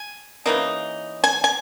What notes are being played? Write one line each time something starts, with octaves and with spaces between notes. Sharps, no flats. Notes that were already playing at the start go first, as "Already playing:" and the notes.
Already playing: G#5
C#3 E3 A#3 D#4
G#5
G#5